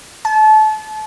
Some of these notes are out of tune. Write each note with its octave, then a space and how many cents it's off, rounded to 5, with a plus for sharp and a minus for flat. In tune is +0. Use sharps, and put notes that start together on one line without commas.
A5 -30